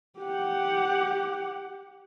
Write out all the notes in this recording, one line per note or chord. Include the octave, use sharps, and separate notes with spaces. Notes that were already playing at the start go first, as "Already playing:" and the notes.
G4 F#5